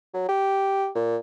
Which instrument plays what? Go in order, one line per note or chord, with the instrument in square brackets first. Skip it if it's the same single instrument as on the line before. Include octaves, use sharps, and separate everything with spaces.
[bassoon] F#3
G4
A#2